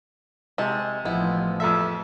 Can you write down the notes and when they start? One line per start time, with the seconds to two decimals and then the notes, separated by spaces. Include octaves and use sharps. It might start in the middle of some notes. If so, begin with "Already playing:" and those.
0.58 C3 G#3 A5
1.05 A1 F3 G#3 B3 E4
1.60 F2 A4 E5